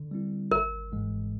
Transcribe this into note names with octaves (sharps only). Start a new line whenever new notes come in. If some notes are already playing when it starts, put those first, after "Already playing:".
Already playing: D3
G3 C4 E4
G#1 A#4
G#2 E3 G#3